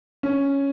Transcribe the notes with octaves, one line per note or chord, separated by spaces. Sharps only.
C#4